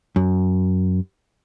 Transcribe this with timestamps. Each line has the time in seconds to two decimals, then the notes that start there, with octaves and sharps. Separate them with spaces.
0.16 F#2